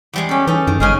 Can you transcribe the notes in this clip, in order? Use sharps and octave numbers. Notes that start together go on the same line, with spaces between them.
E2 G3 G#3
C#4 G4 A4
E3 C#4 D#4 A4
F#2 D#3
G1 C#3 G#3 C#4 G#4 G#5 F6